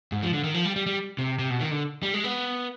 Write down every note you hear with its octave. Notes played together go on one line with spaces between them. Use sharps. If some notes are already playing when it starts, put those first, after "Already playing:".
G#2
F3
D3
D#3
F3
G3
G3
G3
C3
C3
B2
D#3
D3
G3
G#3
B3